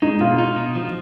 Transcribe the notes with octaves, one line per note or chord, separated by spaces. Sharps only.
G#3 D#4
B2 F4
D#4
B2
F3